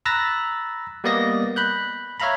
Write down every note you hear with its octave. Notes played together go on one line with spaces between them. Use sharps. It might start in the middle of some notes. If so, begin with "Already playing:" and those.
A#5 B5 E6 F#6 A6 A#6
G3 A#3 B3 D5 D#5 A#6
B5 F#6 G6
C#5 E5 F5 A#5 B5